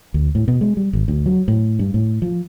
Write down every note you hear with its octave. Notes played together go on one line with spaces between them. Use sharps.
D2
A2
B2
G#3
G3
G#1
D2
F#3
A2
G2
A2
F3